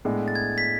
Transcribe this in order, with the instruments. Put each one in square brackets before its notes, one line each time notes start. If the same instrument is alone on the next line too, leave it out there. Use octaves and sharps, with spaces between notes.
[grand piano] A2 G#3 B3 D4 G#4
[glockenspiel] A6
G#6
B6